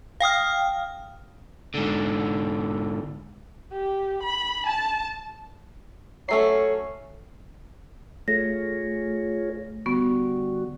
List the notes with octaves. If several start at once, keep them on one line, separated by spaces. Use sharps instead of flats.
F5 G5 D#6 F6
G#2 D3
G4
B5
A5
F#3 A3 C#4 A4 C#5 C7
A3 F4 G#4 C#5 A#6
D3 G3 B3 F#4 C#6